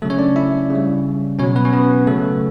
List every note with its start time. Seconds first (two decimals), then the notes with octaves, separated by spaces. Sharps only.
0.02 C#3 F#3 A3 A4
0.10 C#4 C#5
0.19 D4 D5
0.36 E4 E5
0.70 C#3 G3
1.38 B2 F#3 C#4 C#5
1.55 B3 B4
1.65 C#4 C#5
1.73 B3 B4
2.07 C#3 F#3 A3 A4